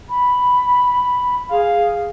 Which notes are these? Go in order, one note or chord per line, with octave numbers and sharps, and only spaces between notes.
B5
G#4 F5